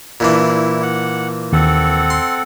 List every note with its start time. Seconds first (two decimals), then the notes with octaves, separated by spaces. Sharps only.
0.20 A#2 E3 D4 E4
0.82 F#5
1.53 D#2 C4 A4 F#5
2.10 C6